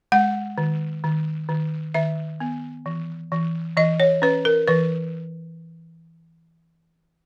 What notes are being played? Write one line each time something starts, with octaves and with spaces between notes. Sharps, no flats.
G#3 F#5
D#3
D#3
D#3
D#3 E5
B3
E3
E3
E3 D#5
C#5
C#4 B4
A#4
E3 B4